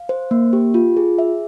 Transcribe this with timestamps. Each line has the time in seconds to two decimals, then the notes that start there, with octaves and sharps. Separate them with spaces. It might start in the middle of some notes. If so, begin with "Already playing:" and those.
Already playing: F5
0.09 C5
0.31 A#3
0.53 G4
0.74 F4
0.97 G#4
1.18 E5